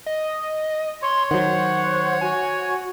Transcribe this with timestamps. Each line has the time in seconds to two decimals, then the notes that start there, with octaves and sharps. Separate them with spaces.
0.06 D#5
1.02 C#5 C6
1.31 D#3 F#3 C5 F#5
2.21 F#4 G#5